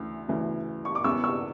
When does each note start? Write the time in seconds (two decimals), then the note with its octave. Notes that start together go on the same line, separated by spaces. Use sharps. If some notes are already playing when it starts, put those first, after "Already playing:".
Already playing: D2 C#3 E3
0.28 D2 C#3 E3
0.85 C#6
0.95 D6
1.04 E2 C#3 E3 C#6 E6
1.24 C#6 E6